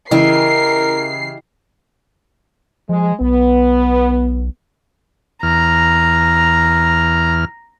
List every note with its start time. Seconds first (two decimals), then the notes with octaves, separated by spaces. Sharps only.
0.11 C#3 E3 E4 G4 A#4 D#5 C7
2.89 F3 G#3
3.21 B1 B3
5.43 E2 A#5 F6